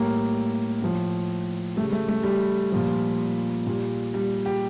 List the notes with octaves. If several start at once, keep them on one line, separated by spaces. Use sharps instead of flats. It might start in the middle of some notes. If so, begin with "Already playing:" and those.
Already playing: A2 G3 A#3
A2 F3
C#3 G3 A3
A3
A3
G3
A#2 F3
A#2 G3
G3
G4